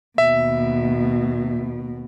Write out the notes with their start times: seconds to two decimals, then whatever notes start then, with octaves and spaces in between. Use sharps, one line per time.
0.18 D#2 B2 E5